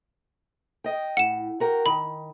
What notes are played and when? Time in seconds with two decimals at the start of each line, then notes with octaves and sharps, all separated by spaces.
0.84 D#5 G5
1.17 A2 F#5 E7
1.60 F#4 A#4 G5
1.86 D#3 B5